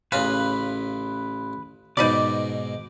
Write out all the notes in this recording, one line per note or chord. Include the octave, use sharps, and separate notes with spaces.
A1 C#3 F4 B4 B5
G#2 B2 D#4 B4 D5 D6